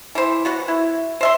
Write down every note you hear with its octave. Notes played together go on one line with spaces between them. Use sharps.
E3 C5
B3 F#4 F#5
E4
C5 E5 C6